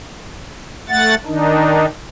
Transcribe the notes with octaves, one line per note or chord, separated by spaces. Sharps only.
A3 F#5 A6
D#3 D4 D#4